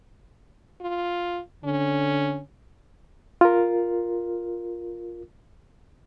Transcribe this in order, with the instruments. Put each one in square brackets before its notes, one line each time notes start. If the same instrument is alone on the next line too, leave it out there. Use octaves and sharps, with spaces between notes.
[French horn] F4
[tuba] D3 [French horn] C#4
[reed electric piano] F4 A#4